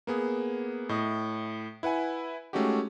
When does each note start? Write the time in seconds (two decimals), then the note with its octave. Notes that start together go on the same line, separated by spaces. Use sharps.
0.07 A#3 B3 G#4
0.89 A2 D#5
1.83 E4 B4 F#5 G#5
2.53 G#3 A3 C#4 D#4 F#4 G4